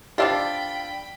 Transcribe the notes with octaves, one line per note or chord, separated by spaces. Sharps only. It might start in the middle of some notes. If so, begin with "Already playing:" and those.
F3 D4 F4 G4 D5 G5 B5 E6